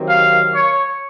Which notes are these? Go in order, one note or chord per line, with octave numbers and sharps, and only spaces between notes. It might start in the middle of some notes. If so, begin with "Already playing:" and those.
Already playing: C3 D#3 F#3
F5
C#5